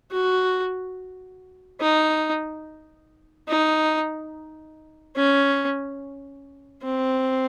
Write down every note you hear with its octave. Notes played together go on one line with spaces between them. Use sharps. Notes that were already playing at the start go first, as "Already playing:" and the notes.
F#4
D#4
D#4
C#4
C4